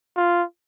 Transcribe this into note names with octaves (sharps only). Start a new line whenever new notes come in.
F4